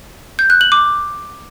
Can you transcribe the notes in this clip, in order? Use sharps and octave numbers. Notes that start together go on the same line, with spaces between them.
G6
F#6
F#7
D6